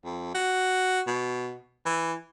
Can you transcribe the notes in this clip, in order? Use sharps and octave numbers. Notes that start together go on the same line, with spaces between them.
F2
F#4
B2
E3